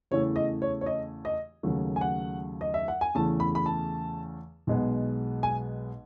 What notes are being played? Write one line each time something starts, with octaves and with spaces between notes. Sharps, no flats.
E2 C#3 E3 A3 C#5
D#5
C#5
C#5
D#5
D#5
D#2 C#3 F#3 A3
G#5
F#5
D#5
E5
F#5
G#5
E2 C#3 E3 A3 A5
B5
B5
A5
B1 B2 G#3 B3
G#5